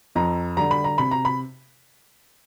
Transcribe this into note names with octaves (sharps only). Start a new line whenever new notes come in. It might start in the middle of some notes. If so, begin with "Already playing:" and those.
F2 A#5
D3 G3 A#5
B5
A#5
C3 B5
A#5
B5